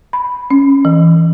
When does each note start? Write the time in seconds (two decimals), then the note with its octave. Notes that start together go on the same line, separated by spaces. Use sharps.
0.13 B5
0.51 C#4
0.85 E3